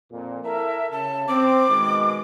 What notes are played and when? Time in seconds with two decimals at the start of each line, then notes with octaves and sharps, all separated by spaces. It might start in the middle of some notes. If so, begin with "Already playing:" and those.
0.12 F2 A#2
0.44 E4 A4 A#4 E5
0.92 C#3 A5
1.28 C4 D6
1.70 B2 D#3 G#3